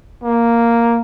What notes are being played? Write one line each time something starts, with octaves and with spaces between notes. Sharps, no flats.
A#3